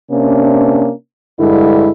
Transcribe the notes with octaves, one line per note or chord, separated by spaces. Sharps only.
C3 A#3 C#4 D4
G2 D3 G#3 E4